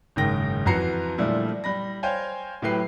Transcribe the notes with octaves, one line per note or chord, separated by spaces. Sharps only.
F#1 G#2 D#3 G5 A#6
F2 E3 F#4 A#5 C7 C#7
A#2 D3 F3 G3 A3 E4
G3 B5 A#6
C5 C#5 F5 G5 G#5
A2 F#3 G4 B4 C7